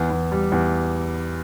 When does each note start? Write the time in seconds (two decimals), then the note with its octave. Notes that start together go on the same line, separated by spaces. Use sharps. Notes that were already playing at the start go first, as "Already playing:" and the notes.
Already playing: E2
0.10 E2
0.32 G3
0.52 E2